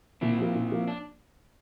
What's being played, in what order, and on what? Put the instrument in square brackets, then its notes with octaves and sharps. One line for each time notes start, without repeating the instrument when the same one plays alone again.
[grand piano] A#2 [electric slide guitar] C4 E4
[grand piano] F3 A#3
A#2
F3 A#3
[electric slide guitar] D4